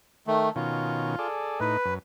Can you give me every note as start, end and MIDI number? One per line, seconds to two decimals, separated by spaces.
0.27 0.49 51
0.27 0.49 57
0.56 1.16 47
0.56 1.16 51
0.56 1.16 61
0.56 1.27 65
1.19 1.60 68
1.19 1.60 69
1.19 1.60 74
1.60 1.77 45
1.60 1.77 63
1.60 1.94 71
1.85 1.99 42